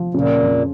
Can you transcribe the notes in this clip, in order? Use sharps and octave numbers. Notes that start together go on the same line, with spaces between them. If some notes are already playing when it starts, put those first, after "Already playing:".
Already playing: F3
A#2 C#3
F2